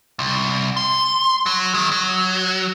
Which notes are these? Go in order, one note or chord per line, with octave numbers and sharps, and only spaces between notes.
C2
C6
F#3
D#3 G#3
F#3